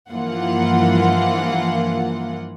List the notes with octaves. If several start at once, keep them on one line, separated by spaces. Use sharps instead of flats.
G2 E3 F3 A#3 F4 F#5